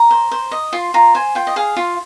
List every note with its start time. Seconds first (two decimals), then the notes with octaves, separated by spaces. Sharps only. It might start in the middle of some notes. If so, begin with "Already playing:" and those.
Already playing: A#5
0.11 C5
0.32 C5
0.51 D#5
0.73 F4 C6
0.94 F4 A#5
1.15 C5 G#5
1.35 F4 G5
1.47 D#5
1.56 G#4 F5
1.77 F4